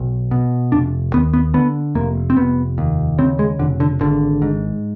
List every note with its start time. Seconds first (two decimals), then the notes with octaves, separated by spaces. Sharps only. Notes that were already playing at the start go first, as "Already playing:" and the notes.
Already playing: B1
0.31 B2
0.72 F1 D4
1.13 D#2 B3
1.33 B3
1.54 D3 B3
1.95 F1 A#3
2.30 C4
2.36 F1 B3
2.78 D#2
3.18 C#3 C4
3.39 G#3
3.59 F1 D3
3.80 D3
4.01 G#1 D3
4.42 G#2